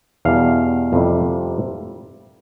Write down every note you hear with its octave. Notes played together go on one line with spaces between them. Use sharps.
E2 B2 G3 F5
F2 C3 G3